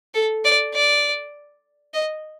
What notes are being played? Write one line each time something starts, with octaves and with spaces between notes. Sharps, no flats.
A4
D5
D5
D#5